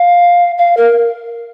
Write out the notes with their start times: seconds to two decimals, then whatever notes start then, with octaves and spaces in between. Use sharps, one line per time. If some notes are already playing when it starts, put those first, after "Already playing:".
Already playing: F5
0.58 F5
0.77 A#4